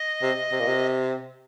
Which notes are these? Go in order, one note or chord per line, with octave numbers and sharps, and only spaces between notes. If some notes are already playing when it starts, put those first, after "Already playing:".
Already playing: D#5
C3
C3
A#2
C3